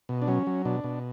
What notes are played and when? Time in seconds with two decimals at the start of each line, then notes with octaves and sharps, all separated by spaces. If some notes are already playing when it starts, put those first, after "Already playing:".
0.09 B2
0.22 D4
0.28 F#3 C#4
0.47 F#3
0.65 B2 D4
0.84 B2